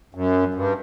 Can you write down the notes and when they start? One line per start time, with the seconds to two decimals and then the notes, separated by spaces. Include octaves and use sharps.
0.15 F#2
0.54 G2